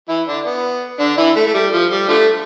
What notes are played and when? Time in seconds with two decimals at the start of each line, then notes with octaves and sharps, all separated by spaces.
0.09 E3 E4
0.27 D3 D4
0.46 B3
1.00 D3 D4
1.17 E3 E4
1.36 A3
1.46 A3
1.54 G3
1.72 F3
1.91 G3
2.08 D3 F3 A3